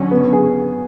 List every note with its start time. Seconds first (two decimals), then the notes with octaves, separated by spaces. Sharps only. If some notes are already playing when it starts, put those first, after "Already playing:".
Already playing: D3 F#3 C#4
0.11 B3
0.33 G#4